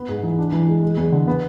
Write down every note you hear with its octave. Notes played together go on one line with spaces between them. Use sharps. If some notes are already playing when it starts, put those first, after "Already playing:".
Already playing: B3
G#2
E3
D4
E3
G#3
G#3
E2
D3
B3